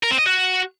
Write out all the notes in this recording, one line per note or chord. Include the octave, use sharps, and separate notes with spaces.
A#4
C4
D#5
F#4